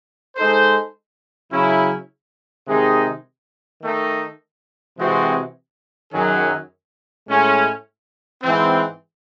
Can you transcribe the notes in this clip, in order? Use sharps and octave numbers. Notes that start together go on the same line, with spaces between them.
G#3 D#4 A4 C5
C#3 F#3 C#4 E4
C3 D#3 G#3 D#4 G#4
D#3 A3 D#4
C3 E3 G#3 C4 F#4
F#2 D#3 F#3 C#4 G#4
A2 G#3 C#4
G#2 E3 C4